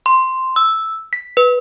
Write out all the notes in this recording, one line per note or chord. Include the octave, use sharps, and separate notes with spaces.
C6
E6
B6
B4